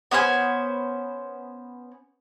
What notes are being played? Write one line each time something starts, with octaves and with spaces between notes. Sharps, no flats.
B3 C#4 C5 G#5